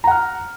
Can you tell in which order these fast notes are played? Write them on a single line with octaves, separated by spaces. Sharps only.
A#5 F#5 F6